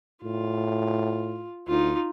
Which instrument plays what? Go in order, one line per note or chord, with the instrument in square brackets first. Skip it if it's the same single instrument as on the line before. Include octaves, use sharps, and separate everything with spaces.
[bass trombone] A2 [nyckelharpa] F4
[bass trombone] D2 [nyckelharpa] D#4 F4